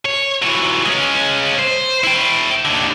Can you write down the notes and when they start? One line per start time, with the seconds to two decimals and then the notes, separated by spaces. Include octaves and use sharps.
0.05 C#5
0.42 E3 F#3
0.85 G#3 C#4
1.59 C5
2.04 E4 G5
2.65 D#2 D3